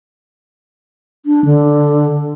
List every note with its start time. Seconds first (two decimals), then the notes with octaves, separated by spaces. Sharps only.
1.26 D4
1.45 D3